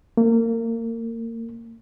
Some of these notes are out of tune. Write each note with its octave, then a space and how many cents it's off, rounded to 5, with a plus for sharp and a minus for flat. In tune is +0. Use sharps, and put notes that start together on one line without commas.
A#3 -30